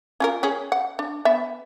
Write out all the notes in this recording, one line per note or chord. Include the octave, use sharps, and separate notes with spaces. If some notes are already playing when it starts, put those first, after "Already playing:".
C#4 F4 A#4
C#4 G#4
F#5
D4
B3 E5